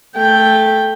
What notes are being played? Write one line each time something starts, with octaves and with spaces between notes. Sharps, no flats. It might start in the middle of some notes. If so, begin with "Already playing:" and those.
A3 G5